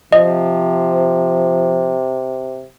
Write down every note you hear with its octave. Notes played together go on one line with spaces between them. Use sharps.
C3 F3 D#5